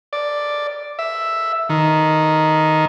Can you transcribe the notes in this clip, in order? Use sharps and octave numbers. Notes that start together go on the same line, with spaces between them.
D5
E5
D#3